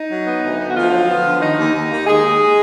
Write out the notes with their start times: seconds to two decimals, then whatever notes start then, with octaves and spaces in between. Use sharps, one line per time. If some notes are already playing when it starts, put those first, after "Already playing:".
Already playing: D#4
0.10 F#3
0.26 B3
0.43 D2
0.59 B3
0.70 F#4
0.75 D2 F3 F4
0.92 F#3
1.08 B3
1.25 D3
1.41 D#3 D#4
1.57 D#2
1.73 D#2
1.90 A#3
2.06 D#2 G#3 G#4
2.23 D#2